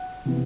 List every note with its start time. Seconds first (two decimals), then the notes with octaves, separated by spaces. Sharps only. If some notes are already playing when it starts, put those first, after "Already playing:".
Already playing: F#5
0.26 C3 E3 B3